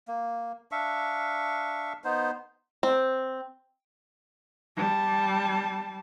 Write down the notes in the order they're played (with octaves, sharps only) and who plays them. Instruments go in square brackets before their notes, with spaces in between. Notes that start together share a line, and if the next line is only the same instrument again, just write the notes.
[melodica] A#3
D4 E5 F5 C#6
B3 D#4 C5
[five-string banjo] C4
[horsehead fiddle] G3 A5